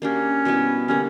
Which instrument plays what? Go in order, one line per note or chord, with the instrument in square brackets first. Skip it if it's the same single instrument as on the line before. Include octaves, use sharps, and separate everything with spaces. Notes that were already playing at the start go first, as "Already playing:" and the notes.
[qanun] A#3 D4 G4 [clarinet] C#4
[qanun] B2 G3 B3 E4
[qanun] D3 G3 A#3 [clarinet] C#4